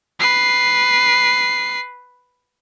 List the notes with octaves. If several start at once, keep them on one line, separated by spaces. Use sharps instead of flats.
B4 C7